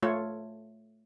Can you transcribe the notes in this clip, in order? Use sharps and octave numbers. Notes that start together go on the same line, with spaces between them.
A3 F4 C#5